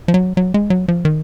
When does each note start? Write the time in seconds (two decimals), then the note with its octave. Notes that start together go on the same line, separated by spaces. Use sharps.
0.08 F3
0.14 F#3
0.37 F#3
0.54 G#3
0.70 F#3
0.88 F3
1.05 D#3